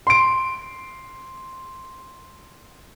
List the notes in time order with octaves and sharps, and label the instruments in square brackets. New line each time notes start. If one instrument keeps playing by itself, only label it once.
[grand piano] C6 D7